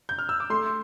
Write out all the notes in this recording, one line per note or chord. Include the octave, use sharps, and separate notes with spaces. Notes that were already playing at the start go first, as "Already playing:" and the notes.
G6
F6
E6
D6
A3 C6